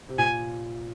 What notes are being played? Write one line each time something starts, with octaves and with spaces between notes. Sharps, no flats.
C3
A#2 G#5